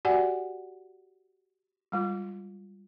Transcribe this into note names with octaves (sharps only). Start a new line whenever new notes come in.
F#4 G4 D5 F#5 G#5
G3 G#3 F4